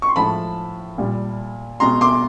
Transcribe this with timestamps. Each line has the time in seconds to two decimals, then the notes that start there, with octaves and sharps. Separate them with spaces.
0.02 C#6
0.09 C6
0.16 A2 F3 G#3 A5 B5
0.98 A#2 G3
1.80 B2 G#3 A#5 C6
2.01 C6 D6